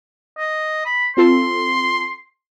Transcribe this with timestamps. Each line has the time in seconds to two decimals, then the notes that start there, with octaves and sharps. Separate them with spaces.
0.38 D#5
0.85 B5
1.17 C4 F4 A4 C6